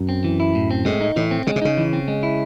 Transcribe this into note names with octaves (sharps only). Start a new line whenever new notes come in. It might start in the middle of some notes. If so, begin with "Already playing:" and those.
Already playing: F#2
C4
E3
E4
A2
C4
A2 G#3
D#4
A2 E3
C4
C#3 G#3
C3
C#3 D#4
E3
C4
G#3
E4